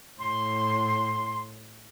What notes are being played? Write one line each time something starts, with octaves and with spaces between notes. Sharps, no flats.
A2 C6